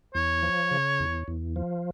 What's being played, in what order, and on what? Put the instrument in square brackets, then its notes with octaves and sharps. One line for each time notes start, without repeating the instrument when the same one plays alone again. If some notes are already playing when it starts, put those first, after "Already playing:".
[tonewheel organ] E2 [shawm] C#5
[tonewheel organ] F3
C#3
E2
E2
F3